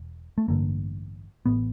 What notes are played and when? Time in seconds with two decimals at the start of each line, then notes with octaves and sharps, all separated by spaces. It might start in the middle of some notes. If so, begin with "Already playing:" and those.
Already playing: E1
0.38 A3
0.48 A1 G2 D3 A#3
1.46 A1 A2 B3